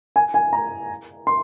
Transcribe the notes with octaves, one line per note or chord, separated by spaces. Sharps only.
G#5
G#5
A#5
C6